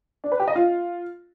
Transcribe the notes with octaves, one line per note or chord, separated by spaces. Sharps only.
D4
B4
G4
D#5
F4